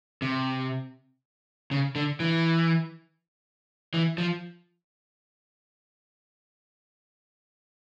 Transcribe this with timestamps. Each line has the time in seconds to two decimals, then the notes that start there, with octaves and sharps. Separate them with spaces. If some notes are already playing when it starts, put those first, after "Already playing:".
0.22 C3
1.71 C#3
1.96 D3
2.20 E3
3.94 E3
4.18 F3